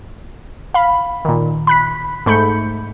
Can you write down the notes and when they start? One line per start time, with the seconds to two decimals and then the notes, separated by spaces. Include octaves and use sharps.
0.74 F5 B5
1.25 A#2 D#3
1.67 B5 F#6 B6
2.26 G#2 A3 B5 G6 C#7